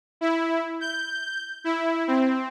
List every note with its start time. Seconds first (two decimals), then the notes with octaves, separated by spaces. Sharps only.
0.21 E4
0.81 G6
1.64 E4
2.08 C4